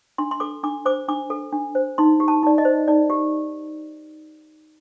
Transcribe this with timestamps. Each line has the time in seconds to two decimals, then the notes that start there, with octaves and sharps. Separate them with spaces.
0.18 D4 C6
0.31 C6
0.40 A4 D6
0.63 D4 D6
0.86 C5 D6
1.08 D4 D6
1.30 A4
1.53 D4
1.75 C5
1.98 D#4 C6
2.20 G4
2.28 A5
2.43 D#4 D5
2.58 D#5
2.65 C5
2.88 D#4 D5
3.10 G4